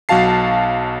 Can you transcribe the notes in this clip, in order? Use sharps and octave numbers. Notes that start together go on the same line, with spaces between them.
B1 F#3 F#4 F5 A5 C7